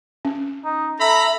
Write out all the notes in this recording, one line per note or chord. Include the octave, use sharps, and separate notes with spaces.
C#4
D#4
A4 E5 A#5 B5